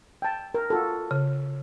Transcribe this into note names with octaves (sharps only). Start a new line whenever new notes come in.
G5 A5
A#4
F4 F#4 A4
C#3